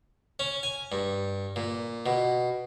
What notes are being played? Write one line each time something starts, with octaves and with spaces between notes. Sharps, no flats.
C#4
G#5
G2
A#2
B2